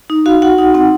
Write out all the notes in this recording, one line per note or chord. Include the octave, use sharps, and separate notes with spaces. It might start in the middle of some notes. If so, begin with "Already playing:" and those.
D#4
F#4 F5
F#4 F#5
D#4 F#5
C4 F#5